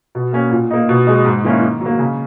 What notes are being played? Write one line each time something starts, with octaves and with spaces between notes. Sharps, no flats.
B2
A#3 C#4
A#2
A#3 D#4
B2
G#3 D#4
G#2
D#3 A#3 C#4 E4
D#3
F#3
A#3
C#3